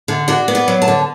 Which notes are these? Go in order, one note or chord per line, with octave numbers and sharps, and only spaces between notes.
D3
D4 F#4
B3
D5
F#3
A5
D3